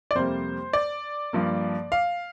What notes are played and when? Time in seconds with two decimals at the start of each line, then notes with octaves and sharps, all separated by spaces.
0.11 D5
0.15 F2 C3 G3 A#3 C5
0.73 D5
1.33 G2 F3 A#3
1.92 F5